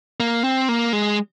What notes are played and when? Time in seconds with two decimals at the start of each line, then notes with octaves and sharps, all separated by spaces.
0.20 A#3
0.44 C4
0.69 A#3
0.93 G#3